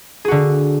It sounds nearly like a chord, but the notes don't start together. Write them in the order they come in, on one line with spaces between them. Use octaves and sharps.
G#4 F#4 D3